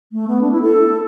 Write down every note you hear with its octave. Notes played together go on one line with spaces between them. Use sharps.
A3
B3
D4
E4
A4